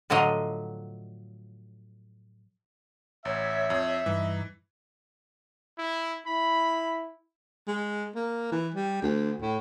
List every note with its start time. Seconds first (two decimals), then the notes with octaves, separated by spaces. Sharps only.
0.10 A2 D3 F3 F#3 D#5
3.25 A1 C#5 E5
3.70 F2
4.06 G2 E3 D#4
5.78 E4
6.27 E4 B5
7.67 G#3
8.15 A#3
8.52 E3
8.74 G3
9.02 D2
9.41 A2